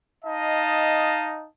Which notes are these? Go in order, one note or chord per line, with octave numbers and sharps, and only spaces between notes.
D#4 D#5 F5 A5